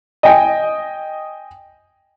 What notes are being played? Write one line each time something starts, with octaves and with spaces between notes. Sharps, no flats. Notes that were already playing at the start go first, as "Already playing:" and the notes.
D#5 G5 G#5